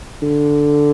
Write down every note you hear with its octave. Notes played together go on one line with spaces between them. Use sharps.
D3